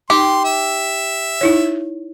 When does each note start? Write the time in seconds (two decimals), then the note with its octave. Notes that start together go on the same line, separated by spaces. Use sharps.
0.10 D#4 G4 C6
0.45 E5
1.41 D#4 E4 C#5